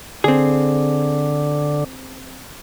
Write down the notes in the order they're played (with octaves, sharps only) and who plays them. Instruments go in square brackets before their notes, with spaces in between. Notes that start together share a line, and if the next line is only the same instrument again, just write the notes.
[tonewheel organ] D3 [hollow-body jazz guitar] C4 G#4